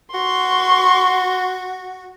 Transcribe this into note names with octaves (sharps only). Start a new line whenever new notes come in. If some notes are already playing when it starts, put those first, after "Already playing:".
F#4 C6 C#6